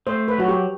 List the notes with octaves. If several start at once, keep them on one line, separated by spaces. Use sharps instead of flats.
A3 C5
B4
F#3 F#4
G4